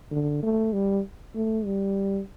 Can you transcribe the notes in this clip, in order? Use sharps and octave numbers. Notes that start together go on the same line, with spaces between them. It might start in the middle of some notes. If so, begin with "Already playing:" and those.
D3
A3
G3
A3
G3